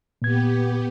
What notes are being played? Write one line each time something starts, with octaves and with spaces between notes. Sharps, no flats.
A#2 B3 G4 G#6